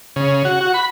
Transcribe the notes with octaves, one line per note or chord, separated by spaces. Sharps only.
C#3
F#4
F#4
B5